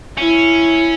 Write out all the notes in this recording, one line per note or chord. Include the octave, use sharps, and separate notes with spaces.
C#4 E4